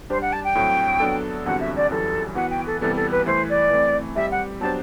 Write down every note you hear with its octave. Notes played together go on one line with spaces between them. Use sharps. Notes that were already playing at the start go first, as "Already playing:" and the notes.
G3 D4 G4 C5
F#5
A5
G5
A2 F#3 A3 C4 F#4
F#3 B3 D4 A4
E2 D3 G3 C4 F#4 F#5
E5
D5
F#2 E3 G3 A4
E3 B3 F#4 B4 F#5
G5
A4
C3 E3 G3 B3 A4
A4
B4
E3 A3 E4 B4 C5
D5
E3 A3 C4
G3 C4 G4 E5
F#5
F#3 B3 D4 G4 C5 A5